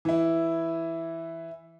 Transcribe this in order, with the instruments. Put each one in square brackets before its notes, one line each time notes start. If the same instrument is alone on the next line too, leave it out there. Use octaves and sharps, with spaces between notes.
[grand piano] E3 E4